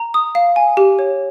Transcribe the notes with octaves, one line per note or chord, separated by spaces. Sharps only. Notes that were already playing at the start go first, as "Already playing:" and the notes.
Already playing: A#5
D#6
F5
G#5
G4
C#5